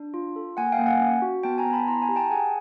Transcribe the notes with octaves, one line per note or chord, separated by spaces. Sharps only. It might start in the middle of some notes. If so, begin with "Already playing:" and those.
Already playing: D4
F4
A4
A#3 F#5 G#5
F5 G5
A#3
F#5 G#5
C#4
F#4
B3 G5 A5
G#5 A#5
B3
A5 B5
E4 A#5 C6
G#5 A#5
G4
G5 A5
G#4 F#5 G#5